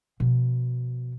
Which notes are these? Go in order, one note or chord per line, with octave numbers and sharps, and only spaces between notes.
B2 F3